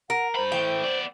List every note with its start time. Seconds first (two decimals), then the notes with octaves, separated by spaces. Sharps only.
0.10 A#4 F#5
0.36 G2 C5 B5
0.52 E3 A3 G5
0.84 B3 D5